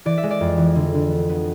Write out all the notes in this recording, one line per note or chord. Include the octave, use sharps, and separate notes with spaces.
E3 D5
E5
G#3
D5
F2
E3
D3
D3
B3
B3